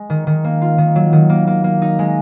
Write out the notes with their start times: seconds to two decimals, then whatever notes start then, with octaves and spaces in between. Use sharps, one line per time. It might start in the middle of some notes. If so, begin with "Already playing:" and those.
Already playing: G#3
0.10 D#3
0.27 D#3
0.44 A#3
0.62 F4
0.78 D#3
0.96 F#3
1.13 D#3
1.29 A#3
1.47 A#3
1.64 A#3
1.82 D#4
1.99 G#3